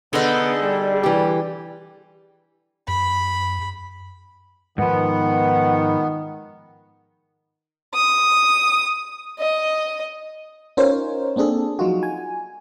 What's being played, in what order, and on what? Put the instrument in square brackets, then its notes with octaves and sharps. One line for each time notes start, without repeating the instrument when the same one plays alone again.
[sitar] D3 A4 [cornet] B3 [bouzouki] D#4 G#4
[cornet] G3
[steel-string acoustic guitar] E3 G4
[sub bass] F#2 [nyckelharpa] B5
[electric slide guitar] G#2 F3 [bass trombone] D#3 [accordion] B3 [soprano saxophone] F#5
[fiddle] D#6
D#5
[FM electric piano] C#4 D#4 F4 A#4 C5 C#5
A#3 C4 D4 G#4 A4
F3 F#3 D#4 F4 F#4
G#5